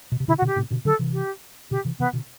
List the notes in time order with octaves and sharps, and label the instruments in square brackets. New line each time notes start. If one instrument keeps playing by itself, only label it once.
[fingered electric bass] B2
C3
[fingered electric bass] B2 D3 [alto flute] E4
[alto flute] F#4
[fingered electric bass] B2 D3
[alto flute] G4
[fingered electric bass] A2 C3
B2 D3
[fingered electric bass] D3 F#3 [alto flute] A4
[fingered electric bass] C3 E3
[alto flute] G4
[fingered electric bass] B2 D3 [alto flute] G4
[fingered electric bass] C3 E3
[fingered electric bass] C3 E3 [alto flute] B3
[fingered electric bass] B2 D3